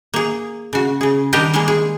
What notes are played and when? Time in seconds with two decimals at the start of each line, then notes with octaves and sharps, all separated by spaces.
0.14 A#3 G#4
0.73 C#3 F#4
1.01 C#3 G#4
1.33 D#3 G3 D4 G4 A#4 D#5
1.54 G3 G#3 A#3 G#4
1.68 G#4